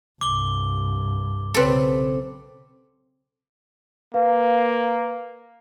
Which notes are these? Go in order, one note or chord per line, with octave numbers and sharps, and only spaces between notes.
C2 G2 D6 G7
B1 C#3 C4 G4 A4 B4
A#3 B4 F5